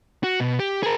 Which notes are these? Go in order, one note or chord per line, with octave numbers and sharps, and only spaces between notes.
F#4
B2
G4
G#4 A#4